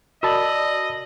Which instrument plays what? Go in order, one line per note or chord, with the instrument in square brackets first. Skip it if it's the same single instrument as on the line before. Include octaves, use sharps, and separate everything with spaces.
[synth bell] F#4 F#7 [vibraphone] D5 [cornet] D#5 [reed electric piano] A5 B5 E6